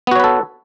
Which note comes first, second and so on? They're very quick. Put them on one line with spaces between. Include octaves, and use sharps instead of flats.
B3 F#4 C#5 B4 A4